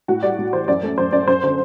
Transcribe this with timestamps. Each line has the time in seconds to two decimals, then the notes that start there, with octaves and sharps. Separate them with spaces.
0.08 A2 F#4
0.22 G3 D5
0.39 A2
0.53 E3 C5
0.68 F#2 D5
0.83 A3
0.98 F#2 C5
1.13 F#2 D5
1.27 F#2 C5
1.44 D3 C5